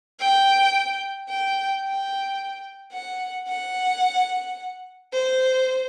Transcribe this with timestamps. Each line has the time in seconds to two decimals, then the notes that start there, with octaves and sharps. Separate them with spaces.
0.20 G5
1.29 G5
1.83 G5
2.93 F#5
3.48 F#5
5.12 C5